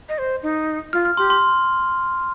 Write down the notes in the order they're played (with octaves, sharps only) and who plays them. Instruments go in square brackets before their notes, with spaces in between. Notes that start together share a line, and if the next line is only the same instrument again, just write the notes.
[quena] D#5
C5
D#4
[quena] F4 [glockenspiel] F6
[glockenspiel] F6
[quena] G4 [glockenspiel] C6
[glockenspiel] C6